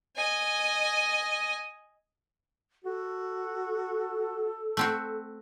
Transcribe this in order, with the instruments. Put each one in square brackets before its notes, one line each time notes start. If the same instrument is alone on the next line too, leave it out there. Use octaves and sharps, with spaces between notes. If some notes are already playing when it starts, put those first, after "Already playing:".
[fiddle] D#5 G#5
[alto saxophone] F#4 [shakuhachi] A4
[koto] A3 C4 F#4